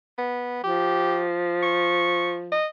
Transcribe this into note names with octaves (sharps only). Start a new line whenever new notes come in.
B3
F3 G4
C#6
D#5